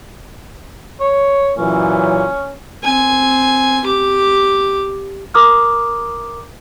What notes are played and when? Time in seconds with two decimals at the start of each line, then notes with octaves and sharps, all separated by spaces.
1.01 C#5
1.58 F#2 A#2 E3 C#4
2.84 C4 G#5
3.84 G4 D6
5.34 A#4 A#5 D6 D#6 F6